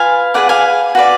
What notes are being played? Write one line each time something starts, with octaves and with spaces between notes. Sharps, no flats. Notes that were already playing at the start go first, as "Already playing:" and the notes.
Already playing: F4 B4 F5 G#5
G#4 B4 D5 F#5
F5 G#5
F#4 B4 D5